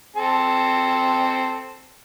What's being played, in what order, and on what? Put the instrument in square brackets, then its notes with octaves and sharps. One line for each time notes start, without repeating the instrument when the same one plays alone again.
[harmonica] C4 A4